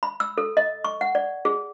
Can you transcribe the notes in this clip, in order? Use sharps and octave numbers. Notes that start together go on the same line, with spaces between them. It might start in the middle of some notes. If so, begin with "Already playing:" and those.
B5
E6
A4
D#5
C#6
F#5
D5
G#4